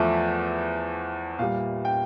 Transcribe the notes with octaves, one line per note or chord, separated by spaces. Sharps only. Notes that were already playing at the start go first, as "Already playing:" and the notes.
Already playing: E2 F3 A3 E5
A#2 G3 F5
G5